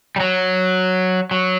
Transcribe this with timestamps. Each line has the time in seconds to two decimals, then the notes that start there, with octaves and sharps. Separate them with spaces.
0.16 G3
0.20 F#3
1.31 F#3